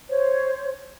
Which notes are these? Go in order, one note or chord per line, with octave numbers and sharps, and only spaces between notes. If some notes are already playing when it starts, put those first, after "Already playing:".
C5 C#5